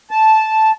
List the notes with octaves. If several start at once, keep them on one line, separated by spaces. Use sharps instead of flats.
A5